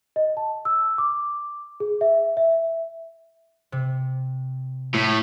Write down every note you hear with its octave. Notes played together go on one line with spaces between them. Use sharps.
D#5
A5
E6
D6
G#4
E5
E5
C3
A2 E6 B6